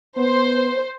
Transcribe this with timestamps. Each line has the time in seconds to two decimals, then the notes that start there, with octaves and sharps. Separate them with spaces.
0.17 B3 C5